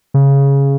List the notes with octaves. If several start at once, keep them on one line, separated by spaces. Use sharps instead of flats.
C#3